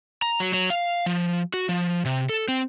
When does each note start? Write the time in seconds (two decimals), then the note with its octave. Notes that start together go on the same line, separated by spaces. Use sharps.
0.22 A#5
0.40 F#3
0.54 F#3
0.70 F5
1.06 F3
1.54 F#4
1.69 F3
2.05 C3
2.29 A4
2.48 C4